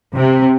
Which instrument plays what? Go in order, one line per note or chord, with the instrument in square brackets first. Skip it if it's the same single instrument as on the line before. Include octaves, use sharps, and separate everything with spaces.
[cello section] C3